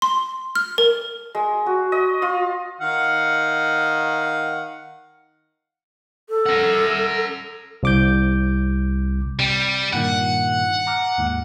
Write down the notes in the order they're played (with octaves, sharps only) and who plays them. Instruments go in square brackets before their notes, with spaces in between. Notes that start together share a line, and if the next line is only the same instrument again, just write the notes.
[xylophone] C6
F6
A#4
[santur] G#3
F#4
D#5
F4
[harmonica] D#3 F5 F#5
[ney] A4
[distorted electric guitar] A#4 F#5
[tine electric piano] C2 D6 G6
[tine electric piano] C3 [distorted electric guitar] G3
[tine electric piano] G2 A#2 D#3 [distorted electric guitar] F#5
[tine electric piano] A#5 D6 F6
D#2 G#2